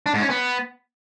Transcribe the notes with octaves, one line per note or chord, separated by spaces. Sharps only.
D4
G#2
C#4
B3